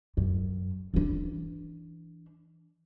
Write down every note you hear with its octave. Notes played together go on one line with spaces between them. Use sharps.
F#2
E3 D4